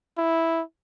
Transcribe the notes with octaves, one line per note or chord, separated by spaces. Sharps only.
E4